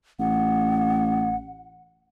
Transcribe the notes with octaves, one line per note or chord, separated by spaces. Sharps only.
A1 F#5